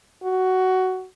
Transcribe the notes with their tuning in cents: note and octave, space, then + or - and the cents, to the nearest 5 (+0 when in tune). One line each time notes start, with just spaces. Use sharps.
F#4 +10